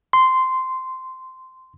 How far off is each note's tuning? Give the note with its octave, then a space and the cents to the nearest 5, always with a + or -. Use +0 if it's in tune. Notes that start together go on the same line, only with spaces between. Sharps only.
C6 -10